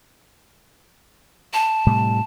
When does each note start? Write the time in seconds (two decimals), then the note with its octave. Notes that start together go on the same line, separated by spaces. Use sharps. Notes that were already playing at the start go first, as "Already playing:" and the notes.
1.54 A5
1.87 A2 C3 G3